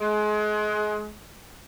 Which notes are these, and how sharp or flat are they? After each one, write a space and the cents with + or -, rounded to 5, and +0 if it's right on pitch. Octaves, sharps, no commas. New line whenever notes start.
G#3 +30